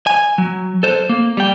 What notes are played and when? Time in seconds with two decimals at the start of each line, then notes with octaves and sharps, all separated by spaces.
0.07 G#5
0.38 F#3
0.83 A4 C5
1.09 A#3
1.37 G3 G5